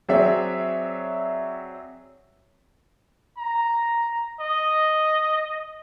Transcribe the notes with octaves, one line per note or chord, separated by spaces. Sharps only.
F#3 C4 G#4 C#5 D5 E5
A#5
D#5